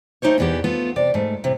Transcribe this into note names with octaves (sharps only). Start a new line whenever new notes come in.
A3 D#4 G4 C5 C#5
E2 B2 E3 B3 G4
A3 B3 F4
C3 D5
G#2 A3
A2 C3